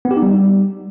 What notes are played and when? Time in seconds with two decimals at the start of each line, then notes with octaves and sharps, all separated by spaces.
0.05 B3
0.11 G4
0.17 D#4
0.22 G3